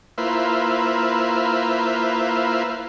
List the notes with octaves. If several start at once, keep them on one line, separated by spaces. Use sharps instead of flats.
A#3 E4 F4 B4 C5